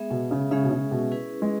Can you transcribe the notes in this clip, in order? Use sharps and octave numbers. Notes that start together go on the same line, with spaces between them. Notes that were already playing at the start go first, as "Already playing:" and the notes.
Already playing: G#3 B3 G#4 E5
B2
C#3
C#3 G#3 C#4 G#4 E5
B2
C#3
B2
C#4 E4 G#4 B4
G#3